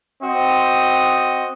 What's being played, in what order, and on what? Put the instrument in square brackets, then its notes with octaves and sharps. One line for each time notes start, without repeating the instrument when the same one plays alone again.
[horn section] C4 F#4 D#5